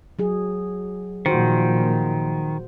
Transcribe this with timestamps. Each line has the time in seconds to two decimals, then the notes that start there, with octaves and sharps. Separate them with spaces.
0.19 F#3 G#4
1.26 A#2 D#3 F3 F#4 C5